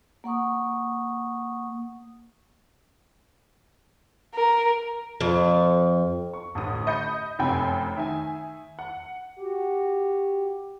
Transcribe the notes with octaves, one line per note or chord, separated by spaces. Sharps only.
A#3 F#5 C#6 D#6
A#4
F2
C#6
A1 D2 D#6
D#5 B5 G6 C#7
F1 F#2 C3 G5 G#5 B5
D#3 E5 G#5
F#5
F#4 G4